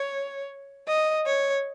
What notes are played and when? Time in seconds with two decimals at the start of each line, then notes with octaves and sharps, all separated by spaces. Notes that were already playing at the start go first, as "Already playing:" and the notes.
Already playing: C#5
0.88 D#5
1.26 C#5